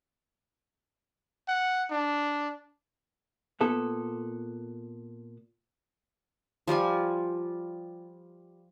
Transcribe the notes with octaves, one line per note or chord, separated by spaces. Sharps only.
F#5
D4
A#2 B3 A4
F3 G3 F4 G#5